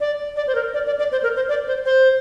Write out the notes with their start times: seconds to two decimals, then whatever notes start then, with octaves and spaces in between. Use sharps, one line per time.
0.01 D5
0.36 D5
0.47 C5
0.55 A#4
0.74 D5
0.86 D5
0.99 D5
1.12 C5
1.23 A#4
1.36 C5
1.49 D5
1.67 C5
1.86 C5